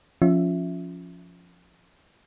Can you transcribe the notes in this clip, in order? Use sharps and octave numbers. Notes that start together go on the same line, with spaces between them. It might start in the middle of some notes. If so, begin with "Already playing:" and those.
F3 C#4 F4 E5